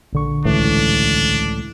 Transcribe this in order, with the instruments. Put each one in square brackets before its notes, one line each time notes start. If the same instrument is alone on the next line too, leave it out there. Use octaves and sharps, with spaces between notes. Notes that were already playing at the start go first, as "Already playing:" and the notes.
[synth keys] A#1 D3 C#6
[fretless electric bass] C#2 A2 E3 [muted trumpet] D4